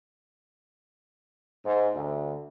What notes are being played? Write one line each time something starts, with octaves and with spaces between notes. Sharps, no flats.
G#2
D2